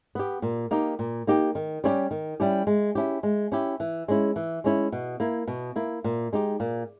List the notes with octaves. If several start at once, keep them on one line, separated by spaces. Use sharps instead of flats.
B3 G4
A#2
A#3 D#4 G4
A#2
A#3 D#4 G4
D#3
G3 C#4 E4 G4
D#3
G3 C#4 E4 G4
G#3
C#4 E4 G4
G#3
C#4 E4 G4
E3
G#3 C#4 E4
E3
G#3 C#4 E4
B2
A#3 E4
B2
A#3 E4
A#2
G#3 D#4 G4
A#2